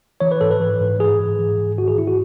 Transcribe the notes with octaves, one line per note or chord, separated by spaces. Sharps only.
E3 C#5
B4
G#2 A4
B4
E3
G#2
E3 G#4
G#2
E3
G#2
D#3 F#4
G#4
G#2 E4
F#4